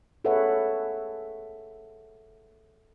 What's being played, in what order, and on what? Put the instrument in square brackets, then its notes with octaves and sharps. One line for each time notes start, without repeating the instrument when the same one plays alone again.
[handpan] G#4 A4 B4 C#5 E5 F#5